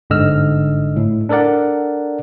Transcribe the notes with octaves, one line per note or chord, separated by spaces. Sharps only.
G1 G#2 D3 D#5 E6 F6
A2
D4 A4 A#4 D5 F#5